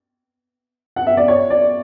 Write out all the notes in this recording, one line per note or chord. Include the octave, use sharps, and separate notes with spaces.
F#5
E5
D5
C#5
D5